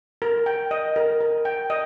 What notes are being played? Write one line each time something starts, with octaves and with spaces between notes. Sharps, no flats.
A#4
G5
D#5
A#4
A#4
G5
D#5